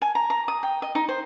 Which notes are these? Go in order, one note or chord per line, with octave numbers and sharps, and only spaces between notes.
G#5
A#5
A#5
D#6
G5
D#5
D#4
C5